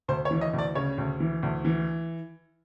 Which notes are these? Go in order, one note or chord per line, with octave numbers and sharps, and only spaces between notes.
D2 C5
C#5
E3
D#5
D2
D5
C#3 C#5
D2
E3
D2
E3